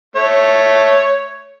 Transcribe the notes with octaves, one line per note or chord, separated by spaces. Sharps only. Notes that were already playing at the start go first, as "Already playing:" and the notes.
A3 C#5